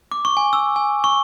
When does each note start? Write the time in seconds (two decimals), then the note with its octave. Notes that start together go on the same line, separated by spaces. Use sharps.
0.12 D6
0.25 C#6
0.37 G#5
0.53 E6
0.76 G#5
1.04 C#6